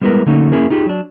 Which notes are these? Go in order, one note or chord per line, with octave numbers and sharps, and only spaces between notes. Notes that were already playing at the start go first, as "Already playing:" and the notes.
G3 G#3 B3 E4 A#4 B4
D3 F#3 A3 A#3 C#4 D#4
A#3 C#4 E4 G#4 A#4
D#4 F4 G4 G#4
F#3 D4